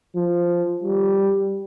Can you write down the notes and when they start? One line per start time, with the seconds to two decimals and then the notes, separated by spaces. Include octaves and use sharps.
0.16 F3
0.84 G3